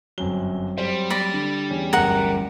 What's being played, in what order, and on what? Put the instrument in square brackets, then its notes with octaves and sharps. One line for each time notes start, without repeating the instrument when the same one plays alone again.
[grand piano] G1 F#2 G7 [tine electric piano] F#3 C4
[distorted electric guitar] G3 [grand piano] C5
[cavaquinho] D5 B5 [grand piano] A#6 B6 D7
[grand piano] D3
[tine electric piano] E2 C#4
[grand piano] D1 G1 [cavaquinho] A#4 F#5